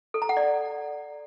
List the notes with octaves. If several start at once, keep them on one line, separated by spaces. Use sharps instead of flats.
A4
A#5
F#5
D5